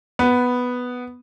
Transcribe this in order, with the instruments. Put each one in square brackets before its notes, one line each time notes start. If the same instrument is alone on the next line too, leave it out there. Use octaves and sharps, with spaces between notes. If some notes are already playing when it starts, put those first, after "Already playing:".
[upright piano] B3